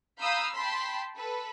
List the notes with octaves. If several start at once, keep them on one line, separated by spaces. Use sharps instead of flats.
F5 A#5 B5 D#6 E6 G6
G5 A5 B5 C6 B6
A4 B4